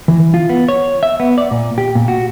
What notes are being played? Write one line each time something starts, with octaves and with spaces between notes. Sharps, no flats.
E3
F4
B3
C#5
E5
B3
D5
A#2
G4
A#2
F#4